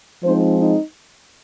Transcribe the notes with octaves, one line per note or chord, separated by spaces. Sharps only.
F3 G#3 C4 D#4 C5
D#4